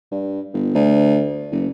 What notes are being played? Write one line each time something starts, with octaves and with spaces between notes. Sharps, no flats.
G2
G1
D2
F#1